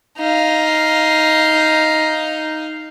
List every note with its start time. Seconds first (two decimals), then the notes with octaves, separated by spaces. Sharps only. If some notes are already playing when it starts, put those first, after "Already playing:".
0.18 D#4 F5